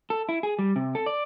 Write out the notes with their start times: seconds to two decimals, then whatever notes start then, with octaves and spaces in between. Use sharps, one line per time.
0.10 A4
0.29 E4
0.43 G#4
0.59 G3
0.76 C3
0.95 A4
1.06 D5